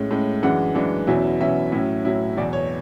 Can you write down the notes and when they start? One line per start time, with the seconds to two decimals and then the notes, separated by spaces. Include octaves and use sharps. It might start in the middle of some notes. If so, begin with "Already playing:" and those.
Already playing: A2 G#3 C#4
0.11 A2 G#3 C#4
0.43 F#2 E3 G#3 D4 F#5
0.75 F#2 E3 G#3 D4
1.07 E2 B2 F#3 C#4 E4
1.40 E2 B2 F#3 C#4 E4 E5
1.72 A2 F#3 C#4 E4
2.05 A2 F#3 C#4 E4
2.36 E2 B2 F#3 D5
2.53 C#5